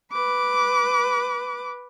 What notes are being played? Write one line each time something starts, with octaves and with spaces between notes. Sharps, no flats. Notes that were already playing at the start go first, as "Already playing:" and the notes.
B4 D6